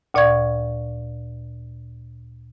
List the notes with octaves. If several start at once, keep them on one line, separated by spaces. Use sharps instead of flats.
D2 A#2 D5 F5 C#6 G#6